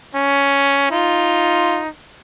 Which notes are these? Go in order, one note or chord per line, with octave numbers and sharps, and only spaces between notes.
C#4
D#4 F4